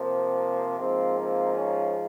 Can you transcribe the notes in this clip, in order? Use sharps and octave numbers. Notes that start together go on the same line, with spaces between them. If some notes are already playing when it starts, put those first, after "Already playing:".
Already playing: C3 F3 A#3
G#2 F3 A#3 C4
C4
C#4